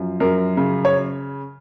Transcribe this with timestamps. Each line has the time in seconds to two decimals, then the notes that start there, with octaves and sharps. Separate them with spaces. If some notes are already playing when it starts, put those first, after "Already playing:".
Already playing: F#2 F3
0.20 F#2 A#4
0.57 C#3
0.85 C#5